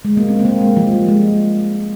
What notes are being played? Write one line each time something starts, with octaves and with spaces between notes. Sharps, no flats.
G#3
A#3
C4
C4
A#3
G#3
F3
G3
G#3